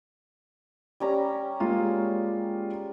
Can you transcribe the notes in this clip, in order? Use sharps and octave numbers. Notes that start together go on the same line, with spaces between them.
G3 C#4 A#5
G#3 A#3 F4